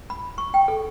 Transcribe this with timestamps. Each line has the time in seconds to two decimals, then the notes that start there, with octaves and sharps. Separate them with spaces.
0.10 B5
0.38 C#6
0.54 G5
0.68 A4